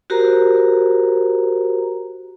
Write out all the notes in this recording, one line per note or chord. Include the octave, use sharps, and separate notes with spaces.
F#4 G4 A#4 C5 A#5